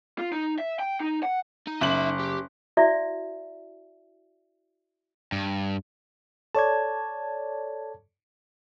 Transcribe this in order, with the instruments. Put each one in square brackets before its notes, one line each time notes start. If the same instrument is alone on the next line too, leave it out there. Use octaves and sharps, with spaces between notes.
[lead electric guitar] F4
D#4
E5
G5
D#4
F#5
[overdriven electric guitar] D#4
[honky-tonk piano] F#1 F#7 [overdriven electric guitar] D#4 E5
[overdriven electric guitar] G4
[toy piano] E4 F#4 D5 E5
[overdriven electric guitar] G2
[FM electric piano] A4 C#5 D5 [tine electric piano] A5 G#6